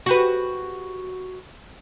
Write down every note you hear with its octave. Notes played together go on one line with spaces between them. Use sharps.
F#4 G4 B4